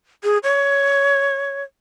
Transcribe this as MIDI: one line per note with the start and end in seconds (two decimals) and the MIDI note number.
0.24 0.38 68
0.44 1.63 73